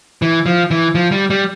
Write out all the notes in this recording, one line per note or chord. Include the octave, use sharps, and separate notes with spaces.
E3
F3
E3
F3
G3
G3